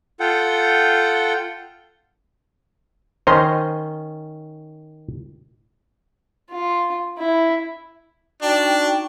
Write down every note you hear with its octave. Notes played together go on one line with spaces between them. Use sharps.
F4 A4 F#5 G5
D#3 C#4 C5 D#5 A#5 C6
F4
E4
D4 D#4 F#4 G5